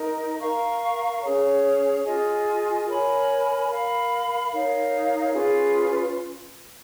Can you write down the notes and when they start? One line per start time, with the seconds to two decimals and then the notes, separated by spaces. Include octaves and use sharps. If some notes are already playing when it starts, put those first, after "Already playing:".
Already playing: D#4 A#4 D#5
0.41 A#4 F5 A#5 C#6
1.22 C#4 G#4 C#5
2.04 F4 G#4 D#5 G#5
2.86 A#4 C#5 G#5 B5
3.69 A#4 F5 B5
4.52 D#4 A#4 C#5 F5
5.33 C#4 F4 G#4 B4